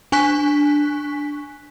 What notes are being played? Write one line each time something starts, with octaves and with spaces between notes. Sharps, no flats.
D4 G#5 C#6 F#6 B6